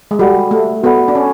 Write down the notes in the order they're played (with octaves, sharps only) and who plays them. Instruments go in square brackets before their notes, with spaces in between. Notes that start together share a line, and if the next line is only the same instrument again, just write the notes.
[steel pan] G#3
[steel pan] G3 [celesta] F#4 A4 D5 F#5 B5
[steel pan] A3
[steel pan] B3 [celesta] F#4 A4 D5 F#5 B5
[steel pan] D4
C#4